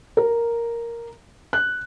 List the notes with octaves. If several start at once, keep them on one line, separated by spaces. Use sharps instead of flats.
A#4
F#6